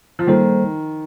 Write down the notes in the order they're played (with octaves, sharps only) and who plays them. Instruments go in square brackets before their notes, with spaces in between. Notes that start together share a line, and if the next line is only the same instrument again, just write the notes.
[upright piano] F3
[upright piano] D#3 [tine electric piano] G3 A#3 D#4 A4 C5